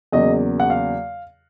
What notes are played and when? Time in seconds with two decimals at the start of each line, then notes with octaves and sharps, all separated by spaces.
0.12 E2 C#3 F#3 A#3 D#5
0.60 F#5
0.70 F5